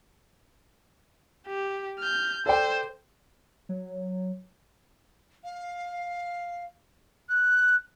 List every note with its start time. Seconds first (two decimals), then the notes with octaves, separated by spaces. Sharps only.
1.48 G4
1.99 F6 G6
2.46 A4 C5 D5 G5
3.69 F#3
5.44 F5
7.29 F#6